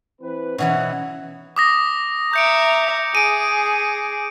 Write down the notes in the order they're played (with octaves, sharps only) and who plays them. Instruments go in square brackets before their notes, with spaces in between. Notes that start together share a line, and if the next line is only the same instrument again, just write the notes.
[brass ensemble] E3 C4 B4
[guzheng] B2 E3 F#3 [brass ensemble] C#4 F#5
[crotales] D6 D#6 A#6
[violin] E5 A#5 [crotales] G6 C#7 D7
[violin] G#4 [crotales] D7 D#7